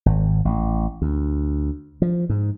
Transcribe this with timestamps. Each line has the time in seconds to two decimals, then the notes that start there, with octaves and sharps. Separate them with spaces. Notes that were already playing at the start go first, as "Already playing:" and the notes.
0.06 G#1
0.45 A1
1.02 D2
2.02 F3
2.29 G#2